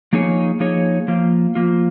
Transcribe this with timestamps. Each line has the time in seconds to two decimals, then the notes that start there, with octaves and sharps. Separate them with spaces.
0.13 F3 A#3 D#4 G#4 C#5
0.60 F3 A#3 D#4 G#4 C#5
1.08 F3 A#3 F4
1.55 F3 A#3 F4